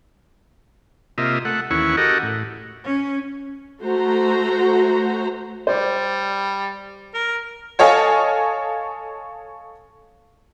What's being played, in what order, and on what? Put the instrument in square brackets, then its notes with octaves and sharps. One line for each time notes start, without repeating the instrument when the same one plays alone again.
[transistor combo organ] C3 A#3 F4 D#5 E5
A3 F#5
D#2 E3 C#4 E4 F#5 C#6
F#4 G4 A4 A#4 D#5 F#5
A2
[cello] C#4
[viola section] A3 F#4 C5 A#5
[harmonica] G3 [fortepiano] C5 D5
[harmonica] A#4
[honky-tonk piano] A4 C#5 D#5 F5 G#5